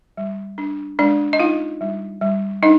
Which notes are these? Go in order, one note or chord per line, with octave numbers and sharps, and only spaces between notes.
G3
D4
G#3 D4 D5
D#5
D#4 F4 F5
G3
G3
D4 D#4 D#5